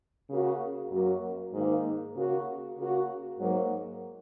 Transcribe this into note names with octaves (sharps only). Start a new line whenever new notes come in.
C#3 A#3 F#4
F#2 F#3 A#3 F#4
G#2 D#3 A#3 D#4
C#3 A#3 F#4
C#3 A#3 F#4
G#2 F#3 A#3